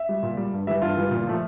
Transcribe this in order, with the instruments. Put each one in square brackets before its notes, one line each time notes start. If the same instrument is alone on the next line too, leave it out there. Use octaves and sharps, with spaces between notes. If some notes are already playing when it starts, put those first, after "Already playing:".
Already playing: [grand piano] E5
G3
A#2
G3
G2
E3 G3 E5
G2 F4
E3 G3
A#2
F3 A3